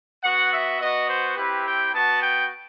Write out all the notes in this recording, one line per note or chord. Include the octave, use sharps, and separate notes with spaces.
B3 F#4 F#5
E5
B3 F#4 D#5
C5
C4 E4 G4 B4
G5
B3 F#4 A5
G5